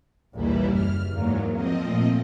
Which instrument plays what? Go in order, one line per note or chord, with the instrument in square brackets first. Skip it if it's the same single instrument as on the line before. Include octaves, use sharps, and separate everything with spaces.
[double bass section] A#1 D#2 [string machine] E3 G3 E4
[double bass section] F#1 [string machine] F6
[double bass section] E2 A#3 [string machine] G#2 F#3
[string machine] F3 C4 D#5
[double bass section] A#2 A3 A#3